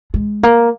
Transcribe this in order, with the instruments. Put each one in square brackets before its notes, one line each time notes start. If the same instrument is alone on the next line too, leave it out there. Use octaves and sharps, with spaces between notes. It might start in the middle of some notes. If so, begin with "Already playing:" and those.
[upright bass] G#3
A#3